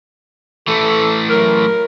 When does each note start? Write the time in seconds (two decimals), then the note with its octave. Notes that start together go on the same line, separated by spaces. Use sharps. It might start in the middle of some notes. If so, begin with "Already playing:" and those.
0.68 E3 A3 A4
1.30 F#3 A#4